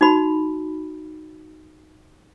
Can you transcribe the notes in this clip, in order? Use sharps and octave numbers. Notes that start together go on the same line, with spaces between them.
D#4 F#4 B5